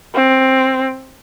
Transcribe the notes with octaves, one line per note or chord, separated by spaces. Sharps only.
C4